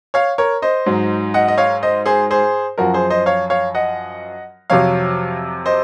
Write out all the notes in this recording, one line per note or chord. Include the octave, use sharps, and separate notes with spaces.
C#5 F5
A#4 C#5
C5 D#5
G#2 F#3
D#5 F#5
D#5
C#5 F5
C5 D#5
G#4 C5
G#4 C5
F#2 F3 F#4 A#4
G#4 C5
C5 D#5
C#5 F5
C#5 F5
D#5 F#5
F2 C3 F#3 C#5 F5
C5 D#5